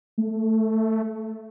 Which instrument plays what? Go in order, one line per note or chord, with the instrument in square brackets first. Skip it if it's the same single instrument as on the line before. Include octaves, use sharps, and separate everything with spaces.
[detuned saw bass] A3